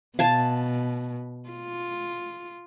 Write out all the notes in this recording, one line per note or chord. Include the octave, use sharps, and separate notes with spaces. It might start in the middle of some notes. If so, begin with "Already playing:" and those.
B2 F5 G#5 A5
F4